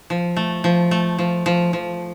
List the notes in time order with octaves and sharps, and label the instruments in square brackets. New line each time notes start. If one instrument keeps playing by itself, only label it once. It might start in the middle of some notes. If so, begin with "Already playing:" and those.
[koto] F3
A3
F3
A3
F3
F3
F3